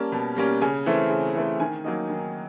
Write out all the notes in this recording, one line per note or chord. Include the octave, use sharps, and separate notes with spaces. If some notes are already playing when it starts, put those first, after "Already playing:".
Already playing: G3 A#3 C#4 A5
B2
G3 A#3 C#4
C#3 G#5
E3 A3 C4
C#3
E3 A3 C4
D#3 G#5
F#3 A#3 D#4
D#3